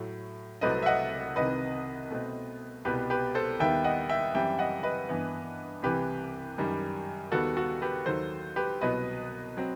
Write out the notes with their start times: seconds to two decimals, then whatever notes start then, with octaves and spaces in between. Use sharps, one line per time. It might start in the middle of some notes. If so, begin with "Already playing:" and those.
Already playing: A2 F#3 A3
0.61 C2 C3 F#3 A3 C4 B4 D#5
0.82 E5
0.86 D#5 F#5
1.36 C2 C3 D#3 B4 D#5
2.11 B2 A3 C4
2.85 C2 B2 G3 G4 B4
3.10 G4 B4
3.35 A4 C5
3.60 D#2 D#3 G3 B3 E5 G5
3.84 D#5 F#5
4.09 E5 G5
4.34 F#2 E3 G3 C4 E5 G5
4.59 D#5 F#5
4.83 B4 D#5
5.09 G2 E3 B3
5.82 C2 C3 E3 G4 B4
6.58 F#2 D#3 G3
7.32 D#2 D#3 G3 B3 F#4 A4
7.57 F#4 A4
7.82 G4 B4
8.06 D#2 D#3 F#3 A4 C5
8.56 G4 B4
8.81 C2 B2 F#3 B3 B4 D#5
9.57 F#3 C4